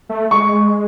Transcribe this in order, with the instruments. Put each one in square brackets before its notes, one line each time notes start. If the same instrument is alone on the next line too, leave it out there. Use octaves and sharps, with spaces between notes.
[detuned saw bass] A3
[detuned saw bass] G#3 [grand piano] C#6